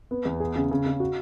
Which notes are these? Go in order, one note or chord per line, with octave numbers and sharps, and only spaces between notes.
B3
E2
G#4
C#3
C#3
C#3
F#4